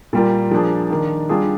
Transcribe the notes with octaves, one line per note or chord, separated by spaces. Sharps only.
A#2 G3 A#3 F4
F3 A#3 D4 G#4
D#3 A#3 D4
G3 D4 F4 G#4